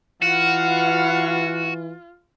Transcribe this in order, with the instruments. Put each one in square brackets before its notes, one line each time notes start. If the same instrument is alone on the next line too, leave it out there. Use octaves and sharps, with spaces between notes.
[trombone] E3 [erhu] F4 [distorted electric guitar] F#4 [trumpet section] B4 F5 F#5